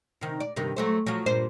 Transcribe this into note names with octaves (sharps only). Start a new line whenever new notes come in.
C3 D#3
D5
G2 C3 D#3
F#3 A3 C5
F3 F#3
G2 A#2 C5